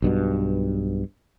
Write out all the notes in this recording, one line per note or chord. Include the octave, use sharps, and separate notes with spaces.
B1 G2 B2